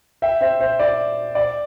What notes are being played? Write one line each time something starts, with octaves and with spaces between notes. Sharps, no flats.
E5 G5
C5 E5
C5
D5
D5